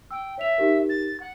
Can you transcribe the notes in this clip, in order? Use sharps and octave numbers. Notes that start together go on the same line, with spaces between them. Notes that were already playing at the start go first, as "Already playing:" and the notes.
G5 E6
C#5 E5 F7
D#4 G4 A#4
A6
F#5